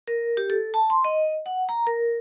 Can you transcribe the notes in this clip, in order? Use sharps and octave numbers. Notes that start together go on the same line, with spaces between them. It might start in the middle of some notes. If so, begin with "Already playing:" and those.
A#4
G4
A4
A5
C6
D#5
F#5
A#5
A#4